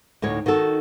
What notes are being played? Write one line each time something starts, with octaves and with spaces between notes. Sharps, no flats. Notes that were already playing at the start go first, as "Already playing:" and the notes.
D2 A2 D#4 C#5
D#3 D#4 F#4 A4